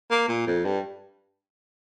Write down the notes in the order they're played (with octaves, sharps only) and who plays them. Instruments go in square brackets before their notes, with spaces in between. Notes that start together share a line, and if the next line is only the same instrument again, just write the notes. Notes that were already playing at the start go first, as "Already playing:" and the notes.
[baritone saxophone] A#3
A#2
F2
G2